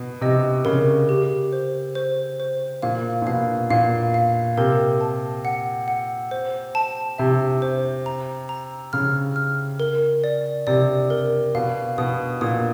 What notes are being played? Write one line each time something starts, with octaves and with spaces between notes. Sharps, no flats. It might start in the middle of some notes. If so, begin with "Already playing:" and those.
Already playing: B2
C3 D#5
C#3 A#4
G4
C5
C5
C5
A#2 F5
A#2
B2 F5
A#2 F5
F5
C3 A#4
A5
F#5
F#5
C5
A5
C3 E5
C5
A#5
A#5
C#3 F6
F6
A#4
D5
C3 D5
A#4
B2 F5
B2 D#6
A#2 D#6